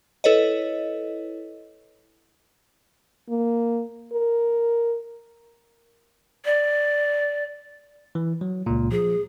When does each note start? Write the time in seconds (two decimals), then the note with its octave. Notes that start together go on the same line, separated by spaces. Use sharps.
0.24 E4 A4 B4 C#5 D#5
3.29 A#3
4.13 A#4
6.45 D5
8.15 E3
8.41 F#3
8.66 C#2 A#2
8.91 F3 G#4